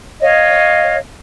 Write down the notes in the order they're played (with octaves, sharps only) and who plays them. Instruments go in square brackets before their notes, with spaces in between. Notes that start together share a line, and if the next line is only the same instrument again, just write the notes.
[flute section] C#5 D#5 F5